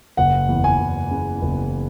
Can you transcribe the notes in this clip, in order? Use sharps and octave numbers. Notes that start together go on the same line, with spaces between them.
F#1 F#5
E2
G#5
F#1
C#3
F#1